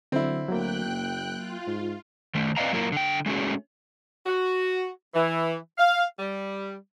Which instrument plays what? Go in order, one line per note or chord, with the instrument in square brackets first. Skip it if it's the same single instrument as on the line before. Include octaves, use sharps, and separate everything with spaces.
[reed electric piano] D3 [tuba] F#3 [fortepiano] C4 E4
[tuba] D2 [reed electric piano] F#3 A#3 [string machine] G5 F#6
[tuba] F#1
[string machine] F4
[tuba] G#2
[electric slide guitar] D#3 A3
C4 B4 D5 D#5 F5 A#5
F#3 A#3 E4 F4 A#4
D3 G5
G#3 A3 C#4 F#4 G#4
[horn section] F#4
E3
F5
G3